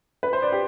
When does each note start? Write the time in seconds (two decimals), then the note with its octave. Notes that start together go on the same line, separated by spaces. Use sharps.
0.23 B4
0.33 C5
0.42 D5
0.52 G4